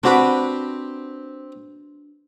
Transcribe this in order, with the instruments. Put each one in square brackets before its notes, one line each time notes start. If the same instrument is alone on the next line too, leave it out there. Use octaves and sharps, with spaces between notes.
[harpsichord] C4 G4 [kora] D4 F#4 B4